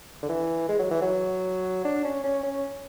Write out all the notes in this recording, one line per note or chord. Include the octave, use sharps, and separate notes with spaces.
D3
E3
G#3
F#3
E3
F#3
D4
C#4
C#4
C#4